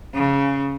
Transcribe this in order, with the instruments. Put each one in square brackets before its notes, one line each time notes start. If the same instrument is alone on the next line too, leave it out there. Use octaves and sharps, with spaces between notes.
[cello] C#3